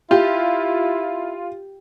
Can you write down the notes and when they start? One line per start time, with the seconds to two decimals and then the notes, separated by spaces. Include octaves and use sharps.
0.11 E4 F4 G4